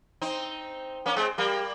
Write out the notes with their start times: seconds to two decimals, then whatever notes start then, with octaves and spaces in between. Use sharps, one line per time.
0.22 C4 D#4
1.06 A#3 C#4
1.17 G#3 C4
1.38 G3 A#3